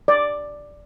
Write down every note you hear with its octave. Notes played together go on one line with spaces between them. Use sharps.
D5